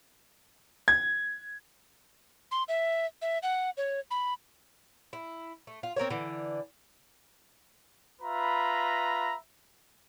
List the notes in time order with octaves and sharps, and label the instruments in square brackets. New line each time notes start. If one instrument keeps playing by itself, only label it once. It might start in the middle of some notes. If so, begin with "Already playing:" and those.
[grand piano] G#6
[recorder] C6
E5
E5
F#5
C#5
B5
[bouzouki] E4
A3
F4
C4 A#4 C5 C#5
D3 E3
[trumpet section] F4 B4 E5 A#5 B5